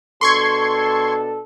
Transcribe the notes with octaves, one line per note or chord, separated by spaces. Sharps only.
B2 D4 A4 C6 C#6 G#6